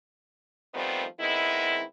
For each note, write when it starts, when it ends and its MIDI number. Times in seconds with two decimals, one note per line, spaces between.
0.74 1.04 51
0.74 1.04 53
0.74 1.04 55
0.74 1.04 57
0.74 1.04 59
0.74 1.04 60
1.20 1.81 51
1.20 1.81 56
1.20 1.81 59
1.20 1.81 60
1.20 1.81 64